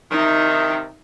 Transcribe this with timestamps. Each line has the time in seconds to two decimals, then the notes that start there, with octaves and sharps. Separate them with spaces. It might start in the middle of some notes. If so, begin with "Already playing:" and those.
0.11 C3 D#3 D#4 E5